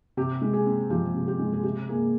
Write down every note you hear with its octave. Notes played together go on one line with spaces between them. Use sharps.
C3 G4
G#3
G#4
C4
F3 G4
C3
G4
G#3
G#4
C3 G4
A#3 G#4